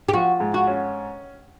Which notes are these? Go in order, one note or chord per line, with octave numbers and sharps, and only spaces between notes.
G4
F3 F#4
G#2
F#4
C#4